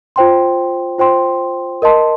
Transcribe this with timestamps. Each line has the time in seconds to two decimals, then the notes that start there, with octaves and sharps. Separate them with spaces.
0.16 F4 C5 G5 C6
0.98 F4 C5 G5 C6
1.82 A#4 D#5 A5 C6